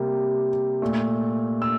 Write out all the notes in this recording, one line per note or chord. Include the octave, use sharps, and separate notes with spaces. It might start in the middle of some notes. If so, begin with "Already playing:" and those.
Already playing: C3 G3 A#3
A#2 A3
E6